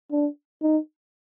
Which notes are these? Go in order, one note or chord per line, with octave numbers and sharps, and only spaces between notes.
D4
D#4